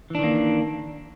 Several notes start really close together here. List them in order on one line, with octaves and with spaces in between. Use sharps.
E3 D4 D#3 A#3